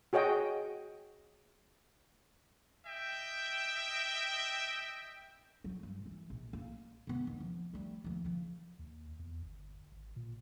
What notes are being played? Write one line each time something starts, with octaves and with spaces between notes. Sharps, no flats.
F#4 G#4 C#5 D#5 G5
D#5 E5 G5
F#3
G2
E3
A#1
A#3
C3 B3
D#2
F3
G3 A3
D#2 F3
C#3 F3
D#2
E2
G1
G#1
A#2